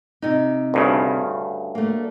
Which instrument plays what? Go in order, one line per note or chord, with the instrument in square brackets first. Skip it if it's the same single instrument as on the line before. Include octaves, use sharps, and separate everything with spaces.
[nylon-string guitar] C3 D#4
[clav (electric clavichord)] D2 G2 C#3
[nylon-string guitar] A3 A#3